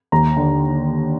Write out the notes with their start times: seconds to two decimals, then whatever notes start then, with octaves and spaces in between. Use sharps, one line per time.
0.12 D#2 A#5
0.37 D3